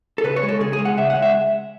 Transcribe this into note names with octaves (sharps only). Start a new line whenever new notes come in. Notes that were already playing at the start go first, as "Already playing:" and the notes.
A4
C#3 B4
C#5
G#3
A4
C#3 G#4
G#4
G#3
F#5
C#3 E5
F#5
G#3
E5